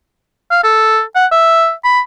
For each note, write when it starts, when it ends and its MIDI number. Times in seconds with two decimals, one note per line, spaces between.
0.51 0.62 77
0.63 1.01 69
1.15 1.26 78
1.31 1.71 76
1.84 2.00 83